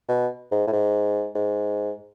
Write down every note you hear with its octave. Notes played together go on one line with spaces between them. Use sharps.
B2
G#2
A2
G#2
G#2